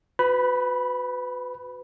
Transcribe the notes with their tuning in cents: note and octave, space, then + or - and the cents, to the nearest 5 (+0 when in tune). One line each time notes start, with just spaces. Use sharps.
F#4 -20 B4 +25 B5 -15